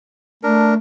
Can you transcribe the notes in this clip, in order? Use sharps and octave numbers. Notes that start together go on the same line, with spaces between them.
A3 D4 A#4